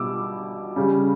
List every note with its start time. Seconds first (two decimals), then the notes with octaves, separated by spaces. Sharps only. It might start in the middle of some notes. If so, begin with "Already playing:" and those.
Already playing: B2 G3 D6 E6
0.76 C#3 G3